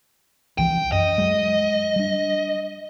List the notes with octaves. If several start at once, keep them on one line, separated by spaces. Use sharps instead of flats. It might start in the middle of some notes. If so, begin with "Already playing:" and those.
C2 E3 F3 G5
F#2 D#5
F#3 G#3
G3 D4